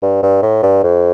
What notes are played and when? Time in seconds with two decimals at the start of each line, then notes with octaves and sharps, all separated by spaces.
0.02 G2
0.22 G2
0.42 A2
0.62 G2
0.83 F2